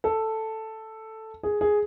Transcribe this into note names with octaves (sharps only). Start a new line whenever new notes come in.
A4
G#4
G#4